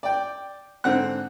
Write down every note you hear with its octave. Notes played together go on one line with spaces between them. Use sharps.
D5 G5
G#2 D3 C4 F#5 F#6